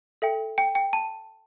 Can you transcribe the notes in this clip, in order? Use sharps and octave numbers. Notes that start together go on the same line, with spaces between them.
A4 E5 G5
G5
G5
A5